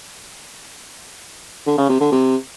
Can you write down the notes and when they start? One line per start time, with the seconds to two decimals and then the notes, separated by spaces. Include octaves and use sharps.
1.67 D3
1.78 C#3
1.89 C3
2.01 D3
2.12 C3